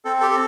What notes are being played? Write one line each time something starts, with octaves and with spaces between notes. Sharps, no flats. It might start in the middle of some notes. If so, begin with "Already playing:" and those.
C4 A4
G4 A4
A4